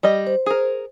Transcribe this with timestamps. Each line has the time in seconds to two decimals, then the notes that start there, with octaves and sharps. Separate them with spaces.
0.03 G3 D#5
0.27 C5
0.46 G#4 A#4